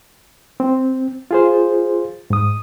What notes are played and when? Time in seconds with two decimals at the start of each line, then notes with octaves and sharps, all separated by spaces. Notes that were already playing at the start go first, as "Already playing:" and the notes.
0.60 C4
1.31 F4 G#4 C5
2.30 G#2 D#6